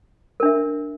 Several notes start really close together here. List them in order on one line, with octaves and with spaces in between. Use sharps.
A#4 D4 E5